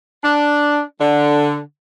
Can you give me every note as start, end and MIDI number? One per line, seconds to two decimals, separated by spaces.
0.23 0.82 62
1.00 1.58 50